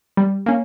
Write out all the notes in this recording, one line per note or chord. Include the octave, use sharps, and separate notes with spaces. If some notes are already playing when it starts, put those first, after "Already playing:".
G3
A#3 C#4